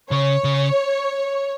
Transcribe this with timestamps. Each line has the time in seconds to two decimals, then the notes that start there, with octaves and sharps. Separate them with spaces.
0.11 C#3 C#5
0.44 C#3